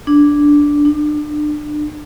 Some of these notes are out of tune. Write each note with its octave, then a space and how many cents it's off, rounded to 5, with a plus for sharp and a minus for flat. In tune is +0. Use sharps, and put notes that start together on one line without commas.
D4 -5
D4 +30